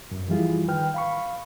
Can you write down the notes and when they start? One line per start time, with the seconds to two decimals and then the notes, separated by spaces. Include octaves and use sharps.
0.11 F#2
0.28 E3 F3 G3 E4 F4 G#4
0.68 D#3 B4 G5 F6
0.94 F5 B5 C#6